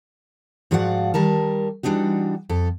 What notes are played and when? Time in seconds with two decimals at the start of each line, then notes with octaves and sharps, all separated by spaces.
0.71 G#2 F3 F#4 D5 F5 F#5
1.14 D#3 G3 A#4 A5
1.83 E3 G3 D4 D#4 F#4
2.49 F2 A4